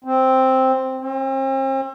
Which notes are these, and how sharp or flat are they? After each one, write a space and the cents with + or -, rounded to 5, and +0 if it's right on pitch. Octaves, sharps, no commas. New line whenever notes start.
C4 +0
C4 +40